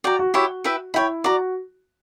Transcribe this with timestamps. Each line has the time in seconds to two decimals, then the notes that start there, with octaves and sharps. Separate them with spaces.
0.04 F#4 D5 G5 A#5
0.19 F#4
0.34 E4 F#4 G4 C#5 E5
0.64 E4 B4 E5 G5
0.94 E4 C#5 G5 B5
1.24 F#4 D5 A#5